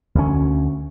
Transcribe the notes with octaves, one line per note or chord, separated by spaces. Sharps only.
D2 C#4